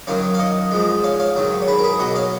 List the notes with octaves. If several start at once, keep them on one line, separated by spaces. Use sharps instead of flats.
F#2 D#3 F#3 C#5 F5
F5
D#5 F#5
G#2 F3 G#3
C#5 F5
C#5 F5
G#2 D#3 F#3
C#5
G#4 B4
A#4
G#4 B4
B2 F#3 D#5 F#5
C#5 F5